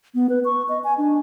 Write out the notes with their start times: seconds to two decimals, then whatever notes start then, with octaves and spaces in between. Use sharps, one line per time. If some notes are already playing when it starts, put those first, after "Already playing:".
0.15 B3
0.30 B4
0.45 C#6
0.69 D#5
0.84 G#5
0.98 D4